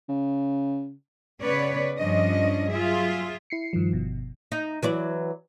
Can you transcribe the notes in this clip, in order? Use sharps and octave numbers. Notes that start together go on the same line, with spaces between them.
C#3
C#3 B3 C#4 B4 C#5 D5
G2 F3 C#4 D4 D#5
F#3 F4 G#4 E5
E4 C7 C#7
G2 D#3 F3
G1 B2
D#4
E3 F#3 D5